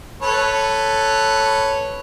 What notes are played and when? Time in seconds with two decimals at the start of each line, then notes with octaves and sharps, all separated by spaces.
0.22 A4 B4 C#5